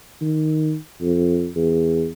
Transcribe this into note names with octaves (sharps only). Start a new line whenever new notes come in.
D#3
F2
E2